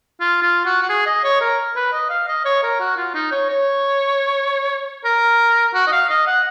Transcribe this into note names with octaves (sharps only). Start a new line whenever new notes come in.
F4
F4
F#4
F#4
G#4
D#5
C#5
A#4
B4
D#5
F5
D#5
C#5
A#4
F#4
F4
D#4
C#5
C#5
A#4
F#4
D#5
F5
D#5
F#5